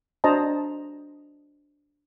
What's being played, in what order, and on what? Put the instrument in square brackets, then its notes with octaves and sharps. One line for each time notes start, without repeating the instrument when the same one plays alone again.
[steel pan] D4 F#4 C5 D#5 A5 A#5